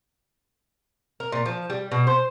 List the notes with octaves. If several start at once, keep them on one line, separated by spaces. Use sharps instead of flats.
A#4
A#2
F3
G3
B2
C5